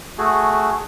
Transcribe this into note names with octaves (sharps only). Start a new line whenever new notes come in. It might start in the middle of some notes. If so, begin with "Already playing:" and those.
A3 F#4 G#4